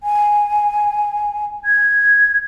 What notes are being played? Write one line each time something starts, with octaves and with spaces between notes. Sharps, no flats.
G#5
G#6